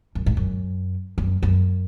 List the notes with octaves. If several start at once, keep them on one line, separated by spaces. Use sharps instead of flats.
F#2
G#2
F#2
F#2
F#2